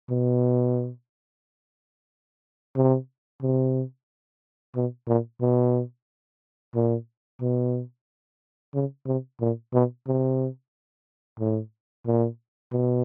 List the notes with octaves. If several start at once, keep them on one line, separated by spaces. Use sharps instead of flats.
B2
C3
C3
B2
A#2
B2
A#2
B2
C#3
C3
A#2
B2
C3
A2
A#2
B2